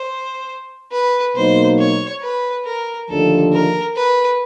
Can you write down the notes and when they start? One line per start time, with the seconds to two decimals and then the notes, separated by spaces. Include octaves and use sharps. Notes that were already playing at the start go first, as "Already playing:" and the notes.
Already playing: C5
0.92 B4
1.35 B2 F#3 A#3 D#4 C5
1.79 C#5
2.22 B4
2.66 A#4
3.09 D#2 D3 F3 A3 D4 A4
3.53 A#4
3.96 B4